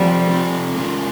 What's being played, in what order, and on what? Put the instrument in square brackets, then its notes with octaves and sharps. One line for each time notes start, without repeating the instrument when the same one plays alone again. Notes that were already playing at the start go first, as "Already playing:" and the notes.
Already playing: [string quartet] F3 G3 [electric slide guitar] A3 C4 F4 A4
[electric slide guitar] A3 C4 F4 A4
G#3 C#4 F4 A#4